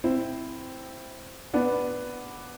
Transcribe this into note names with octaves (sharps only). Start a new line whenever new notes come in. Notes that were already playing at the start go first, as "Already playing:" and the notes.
C4 E4
B3 D4